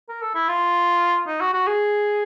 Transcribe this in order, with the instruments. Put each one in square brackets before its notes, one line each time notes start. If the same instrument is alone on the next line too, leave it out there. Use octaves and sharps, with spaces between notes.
[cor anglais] A#4
A4
E4
F4
D#4
F#4
F#4
G#4